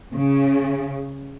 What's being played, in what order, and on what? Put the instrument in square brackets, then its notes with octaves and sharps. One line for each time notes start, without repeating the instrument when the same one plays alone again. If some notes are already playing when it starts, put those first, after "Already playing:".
[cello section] C#3